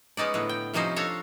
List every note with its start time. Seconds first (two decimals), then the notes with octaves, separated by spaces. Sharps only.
0.17 G#3 B3 C#4 D#4 D5
0.34 A2 D3 B3
0.49 G5
0.74 C3 F3 G3 C#4 D#4 C5
0.96 D4 A4 C#5 F5 A#5